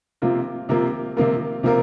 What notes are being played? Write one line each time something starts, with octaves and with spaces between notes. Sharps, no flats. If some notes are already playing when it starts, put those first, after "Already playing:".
C3 F3 A#3 F4 A#4
C3 F3 A#3 F4 A#4
C3 F3 A#3 F4 A#4
C3 F3 A#3 F4 A#4